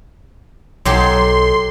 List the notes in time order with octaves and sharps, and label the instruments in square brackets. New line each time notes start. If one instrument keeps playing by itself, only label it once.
[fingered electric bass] B1 [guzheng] F#3 G4 [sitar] D#4 A4 [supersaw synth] C6